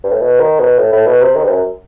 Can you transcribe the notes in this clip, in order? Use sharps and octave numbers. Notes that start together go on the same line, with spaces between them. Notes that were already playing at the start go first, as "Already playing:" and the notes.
G2
A2
B2
D#3
B2
A2
A2
B2
C3
D#3
G2
F#2